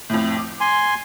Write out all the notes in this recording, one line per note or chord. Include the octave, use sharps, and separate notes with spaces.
F2 A2
D6
G#5 C6